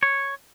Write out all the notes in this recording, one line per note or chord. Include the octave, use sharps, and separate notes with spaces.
C#5